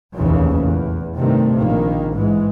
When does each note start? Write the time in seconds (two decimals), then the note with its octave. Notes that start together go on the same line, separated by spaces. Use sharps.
0.15 F1 A#1 D#2 A#2 C#3 E3
0.61 E2
1.17 G2 C3 D#3 A3
1.57 A#1 D#3 A#3
2.13 G#2 E3 G#3